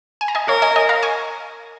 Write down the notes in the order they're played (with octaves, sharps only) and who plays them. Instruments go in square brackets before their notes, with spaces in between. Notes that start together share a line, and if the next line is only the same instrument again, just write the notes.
[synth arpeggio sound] G#5
A#5
D#5 G#5
[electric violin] A#4 [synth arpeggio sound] C#5 F5
[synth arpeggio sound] D#5 G#5
D#5 G#5
F5 A#5
G#5 C#6